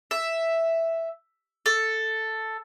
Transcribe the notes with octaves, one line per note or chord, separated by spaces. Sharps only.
E5
A4